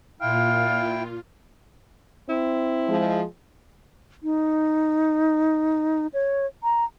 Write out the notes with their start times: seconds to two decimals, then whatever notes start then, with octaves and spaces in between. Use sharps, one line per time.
0.21 A#2 E4 F4 F5 G5
2.29 C4 E4
2.88 F3 G#3
4.23 D#4
6.14 C#5
6.63 A#5